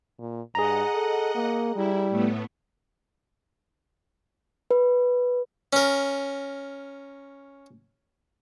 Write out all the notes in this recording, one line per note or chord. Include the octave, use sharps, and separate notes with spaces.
A#2
G2 G#4 D#5 F#5 A#5
A4
A#3
G3 E4
A2 A3 B3
B4
C#4 A#4